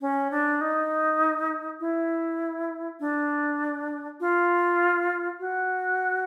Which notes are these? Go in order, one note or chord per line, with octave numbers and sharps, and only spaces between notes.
C#4
D4
D#4
E4
D4
F4
F#4